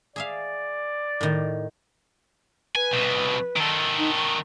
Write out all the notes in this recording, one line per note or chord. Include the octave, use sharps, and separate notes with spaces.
G#4 D5 E5 F5
A2 D#3
B4 G#5
C2 B2
D#3 A4
D#4
C#6